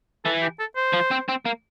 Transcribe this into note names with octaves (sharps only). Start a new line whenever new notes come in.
E3 A4
G4
A4
C5
F3
C4
C4
A#3